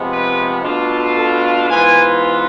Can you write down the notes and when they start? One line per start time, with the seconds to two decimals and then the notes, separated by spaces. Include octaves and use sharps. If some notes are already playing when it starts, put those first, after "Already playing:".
Already playing: C3 F3 G#3 B3
0.10 B4
0.64 B2 A3 D4 F4
1.17 A4
1.69 G#2 E3 B3 F4 G#5